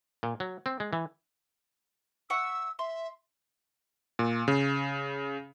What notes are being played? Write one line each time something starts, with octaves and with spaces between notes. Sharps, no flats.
A#2
F#3
C4
G#3
E3
E5 F#5 C#6 E6
E5 C6
A#2
C#3